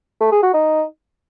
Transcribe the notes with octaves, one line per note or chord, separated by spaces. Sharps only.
A3
G#4
F#4
D#4